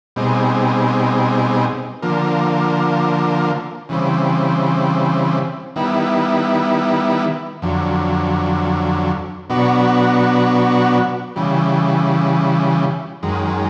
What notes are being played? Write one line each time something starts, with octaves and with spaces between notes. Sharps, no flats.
B2 G3 C4 D#4 G#4
D3 F3 A#3
C#3 E3 G3 C4
D#3 G3 B3 E4
F2 D3 F#3
B2 F#3 B3 D4 F#4
C#3 E3 G3
F#2 D#3 G#3